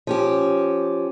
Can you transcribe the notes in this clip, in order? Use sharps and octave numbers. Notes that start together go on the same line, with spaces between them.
F3 C#4 G4